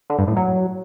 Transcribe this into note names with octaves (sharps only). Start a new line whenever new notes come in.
D3
G2
A2
F#3